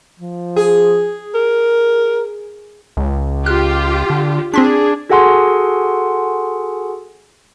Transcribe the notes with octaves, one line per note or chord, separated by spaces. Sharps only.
F3
G#4
A#4
C#2
F4 G4 F6 F#6
D3
C4 D4 G#4 C6 B6
F#4 G#4 A4 F#5 G#5 C6